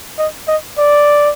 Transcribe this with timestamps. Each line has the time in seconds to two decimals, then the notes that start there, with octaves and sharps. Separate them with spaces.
0.19 D#5
0.48 D#5
0.78 D5